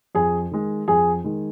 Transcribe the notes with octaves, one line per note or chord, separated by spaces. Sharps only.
F2 G#4 G#5
D#3 G#3
F2 G#4 G#5
D#3 G#3